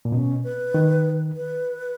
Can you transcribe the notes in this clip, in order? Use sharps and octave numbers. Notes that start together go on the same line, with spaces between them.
A#2
B2 C#4
B4
D#3
B4